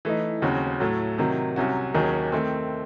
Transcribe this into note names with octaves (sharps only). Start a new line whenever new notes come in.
E3 A3 D#4
D#2 C#3 F#3 C4 F#4
A2 F#3 A3
C3 D#3 F#3
C2 C3 F#3 C#4 F#4
D#2 D#3 F#3 C#4 G#4
D#3 A3 C4